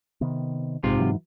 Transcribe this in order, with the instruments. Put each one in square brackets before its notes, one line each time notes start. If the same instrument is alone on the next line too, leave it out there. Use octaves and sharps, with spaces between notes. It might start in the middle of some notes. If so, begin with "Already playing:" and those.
[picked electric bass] C3 D#3 B3
[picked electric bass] A#1 [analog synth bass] G#2 [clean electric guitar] C3 F4
[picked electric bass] E3 F#3